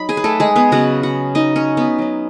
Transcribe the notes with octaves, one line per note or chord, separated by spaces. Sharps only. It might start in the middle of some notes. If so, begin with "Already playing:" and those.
Already playing: F#3 D#4 B5
G#4 G#5
B4
A3 A4
G#3 G#4
B3 B4
C#3 F#3 B3 F#4 F#5
F#4 F#5
D#4 D#5
C#4 C#5
B3 B4
F#3 C#4